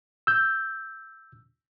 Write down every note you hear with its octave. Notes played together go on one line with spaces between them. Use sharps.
E6 G6